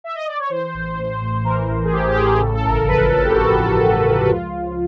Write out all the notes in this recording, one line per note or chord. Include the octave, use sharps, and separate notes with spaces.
E5
D#5
D5
C#5
E3 C5
A1
A2
A1
E3 A#4
A1
G#4
A2 G4
G4
A1 G#4
G#4
C#3 A4
A4
G1 A#4
F2 B4
F3 B4
G4
C#3 F#4
G1
F2
F3
C#2 F4
C#2